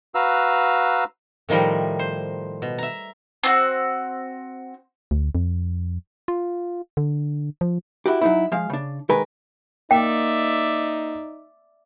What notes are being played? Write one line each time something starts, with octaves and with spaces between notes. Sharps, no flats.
F#4 B4 F5 A#5 E6
A2 D#3 F3 G3 A#4
C5
B2
E5 A#5
C4 F4 F#4
D2
F2
F4
D3
F3
E4 F#4 G4
F#3 D#4 E4
F3 G#3 F5
C#3 D4
D#3 G#3 A#4 B4
A#3 D#4 D5 E5 G5